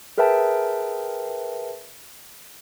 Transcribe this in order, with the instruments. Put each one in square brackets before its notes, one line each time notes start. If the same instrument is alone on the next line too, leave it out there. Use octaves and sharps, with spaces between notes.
[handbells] G#4 A#4 B4 E5 G5 A5